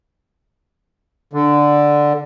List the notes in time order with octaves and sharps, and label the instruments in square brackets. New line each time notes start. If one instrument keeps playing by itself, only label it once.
[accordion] D3